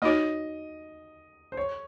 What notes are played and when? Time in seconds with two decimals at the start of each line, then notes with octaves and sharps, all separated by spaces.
0.02 A#3 D#4 F#4 C#5 D#5
1.52 C5
1.57 C#5